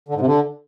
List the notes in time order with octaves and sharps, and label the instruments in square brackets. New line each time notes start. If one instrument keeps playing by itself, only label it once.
[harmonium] D3
G#2
C3
D3